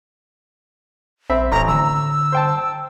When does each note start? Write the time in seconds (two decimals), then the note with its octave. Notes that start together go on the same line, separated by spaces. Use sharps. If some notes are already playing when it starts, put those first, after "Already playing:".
1.30 A#1 C4 E5 B5
1.52 D1 A1 A#5
1.68 D3 A#5 E6
2.32 C5 G5 A5